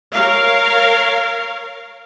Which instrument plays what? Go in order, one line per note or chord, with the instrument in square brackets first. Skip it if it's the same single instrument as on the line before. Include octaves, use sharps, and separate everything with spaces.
[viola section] A#4 C#5 F5